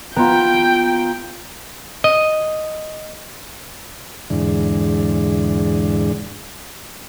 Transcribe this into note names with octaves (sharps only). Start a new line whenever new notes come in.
B3 F4 G5 A#5
D#5
E2 G#2 D3